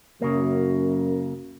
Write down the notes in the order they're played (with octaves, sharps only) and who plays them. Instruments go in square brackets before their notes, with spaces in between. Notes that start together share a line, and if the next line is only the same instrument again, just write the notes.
[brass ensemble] F#2 [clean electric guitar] C#3 A#3